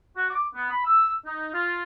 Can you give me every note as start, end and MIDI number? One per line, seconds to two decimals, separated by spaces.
0.17 0.28 66
0.30 0.46 86
0.55 0.70 59
0.71 0.81 83
0.85 1.13 88
1.26 1.52 63
1.54 1.83 65